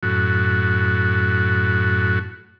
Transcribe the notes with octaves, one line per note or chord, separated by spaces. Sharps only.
F#2 A2 F#4